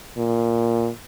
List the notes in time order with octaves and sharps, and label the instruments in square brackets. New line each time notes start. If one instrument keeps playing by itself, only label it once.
[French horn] A#2